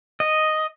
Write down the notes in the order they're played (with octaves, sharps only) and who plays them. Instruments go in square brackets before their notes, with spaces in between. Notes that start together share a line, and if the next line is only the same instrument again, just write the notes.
[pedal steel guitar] D#5